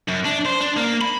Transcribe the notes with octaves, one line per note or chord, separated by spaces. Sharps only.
F#2
D4
C5
D4
A#3
B5